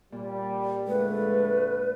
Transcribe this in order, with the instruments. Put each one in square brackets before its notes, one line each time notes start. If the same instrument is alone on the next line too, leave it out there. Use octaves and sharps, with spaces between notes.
[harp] A#2 [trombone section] G3
[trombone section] F2 D3 A3 [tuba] G#3 [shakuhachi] B4